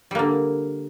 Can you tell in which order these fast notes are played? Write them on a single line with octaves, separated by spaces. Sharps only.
G3 A#3 D3